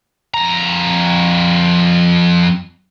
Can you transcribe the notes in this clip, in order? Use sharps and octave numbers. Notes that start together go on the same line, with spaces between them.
F2 A#5